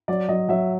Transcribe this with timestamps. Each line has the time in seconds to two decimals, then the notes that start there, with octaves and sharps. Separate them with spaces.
0.08 F#3 D5
0.29 F#3 D#5
0.49 F#3 E5